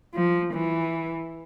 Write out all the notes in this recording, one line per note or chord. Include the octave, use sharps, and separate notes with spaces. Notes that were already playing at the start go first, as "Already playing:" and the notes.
F3
E3